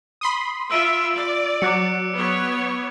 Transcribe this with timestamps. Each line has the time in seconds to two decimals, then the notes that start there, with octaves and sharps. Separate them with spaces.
0.21 B5 C6 D#6
0.71 F4 E5 E6 D7 D#7
1.15 D5
1.62 F#3 D6 F#6 C#7
2.14 B3 C#5